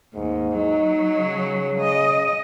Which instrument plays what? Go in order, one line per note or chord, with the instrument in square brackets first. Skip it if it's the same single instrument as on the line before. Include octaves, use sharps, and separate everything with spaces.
[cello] D#2 [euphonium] G#2
[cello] F#3 [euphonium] D#4
[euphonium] C#3
[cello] D#5